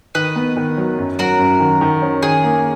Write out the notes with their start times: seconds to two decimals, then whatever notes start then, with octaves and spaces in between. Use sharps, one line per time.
0.15 D#3 B4 D#5
0.36 B3
0.57 D#3
0.77 F#3
0.98 F#2
1.19 F#3 F#4 A#4
1.39 F#2
1.60 D#3
1.81 D#3
2.02 C#4
2.23 D#3 G#4
2.43 A#3